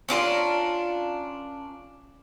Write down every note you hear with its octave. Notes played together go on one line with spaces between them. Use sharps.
C#4 D4 F4 A#4